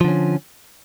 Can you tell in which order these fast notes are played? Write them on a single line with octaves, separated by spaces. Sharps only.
F3 D3 C#4